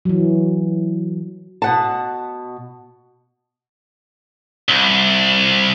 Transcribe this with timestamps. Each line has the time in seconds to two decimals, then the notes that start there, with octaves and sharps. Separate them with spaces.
0.05 E3 F#3
1.62 B2 F#5 A5
4.69 C2